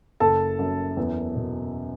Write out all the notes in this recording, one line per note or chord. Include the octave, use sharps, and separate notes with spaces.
F#1 A4 A5
F#2
E2
B2